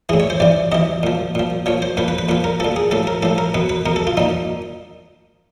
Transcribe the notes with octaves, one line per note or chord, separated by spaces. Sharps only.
A2 E3 G#4
C#5
C5
C3 E3 D5
C3 E3 D#5
A#2 F3
A#2 F3
A#2 F3 C#5
C5
A#2 F3 B4
B4
B4
A#2 F3 B4
A#4
A#2 F3 A4
G#4
A2 F3 A4
A#4
A2 F3 A4
A#4
B2 B4
B4
B2 A#4
A4
F4
A#2 F3 D#4